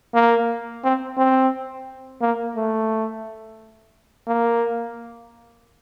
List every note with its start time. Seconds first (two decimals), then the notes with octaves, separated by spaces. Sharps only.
0.14 A#3
0.84 C4
1.18 C4
2.21 A#3
2.56 A3
4.27 A#3